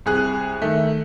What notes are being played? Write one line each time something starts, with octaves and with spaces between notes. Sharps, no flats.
C2 G#4 F#6
D#3 A3